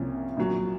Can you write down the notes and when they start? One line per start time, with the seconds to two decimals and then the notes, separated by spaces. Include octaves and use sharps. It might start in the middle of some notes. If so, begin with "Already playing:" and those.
Already playing: C2 C3 F3 A#3 C#4
0.37 A#1 A#2 F#3 A#3